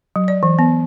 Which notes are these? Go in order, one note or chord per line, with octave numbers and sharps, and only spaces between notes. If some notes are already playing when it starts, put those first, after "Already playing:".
F#3
D5
E3
B3